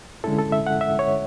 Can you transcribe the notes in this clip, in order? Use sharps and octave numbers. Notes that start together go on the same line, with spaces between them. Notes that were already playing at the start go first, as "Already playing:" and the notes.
D3 G#3 C#4 E4 A4
A4
E5
F#5
E5
C#5